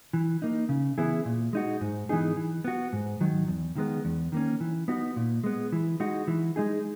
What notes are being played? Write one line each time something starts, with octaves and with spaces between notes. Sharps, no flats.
E3
A#3 D#4
C#3
E3 B3 E4 G#4
A#2
G#3 D#4 F#4
G#2
E3 B3 D#4 G#4
E3
B3 F#4
G#2
D#3 F#3
E2
D#3 G#3 B3
E2
D#3 A#3 C#4
E3
B3 D#4 F#4
A#2
G#3 B3
E3
G#3 D#4 F#4
E3
G#3 D#4 G#4